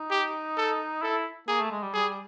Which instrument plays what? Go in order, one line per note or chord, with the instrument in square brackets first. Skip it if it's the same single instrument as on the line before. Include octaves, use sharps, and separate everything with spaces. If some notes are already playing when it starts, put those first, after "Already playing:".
Already playing: [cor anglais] D#4
[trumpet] G4
A4
[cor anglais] E4 [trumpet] A4
[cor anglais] A#3 [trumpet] G#4
[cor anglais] A3
G#3
G3
[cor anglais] G3 [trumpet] G#4